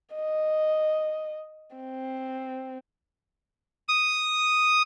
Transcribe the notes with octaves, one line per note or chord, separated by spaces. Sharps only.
D#5
C4
D#6